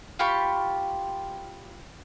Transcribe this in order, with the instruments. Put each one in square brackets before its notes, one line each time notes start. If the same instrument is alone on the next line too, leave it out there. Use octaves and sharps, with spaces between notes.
[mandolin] F4 G4 B5 C#6